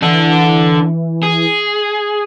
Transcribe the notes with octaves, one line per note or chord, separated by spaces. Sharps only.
E3 D4 A4
G#4